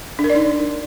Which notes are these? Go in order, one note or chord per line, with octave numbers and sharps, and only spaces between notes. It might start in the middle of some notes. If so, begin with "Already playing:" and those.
D4
A#4
D5
D#4